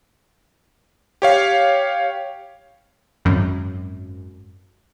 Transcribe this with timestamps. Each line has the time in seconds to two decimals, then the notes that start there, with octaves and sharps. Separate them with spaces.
1.22 G4 C#5 F5
3.25 G#1 F#2